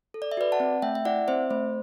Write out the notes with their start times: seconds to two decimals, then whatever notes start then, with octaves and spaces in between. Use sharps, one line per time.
0.14 A4
0.22 D5
0.32 E5
0.37 F#4 B4 D5
0.52 F#5 A5
0.60 C4
0.82 A3 E5 G5
0.95 E5
1.05 E4 D5 F#5
1.28 C4 C5 E5
1.50 A3 C5